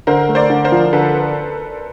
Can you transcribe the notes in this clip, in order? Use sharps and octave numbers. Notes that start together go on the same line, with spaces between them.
D3 A#4 C5
A3
C5 D5
D3
A#4 C5
F3
D3 A4 B4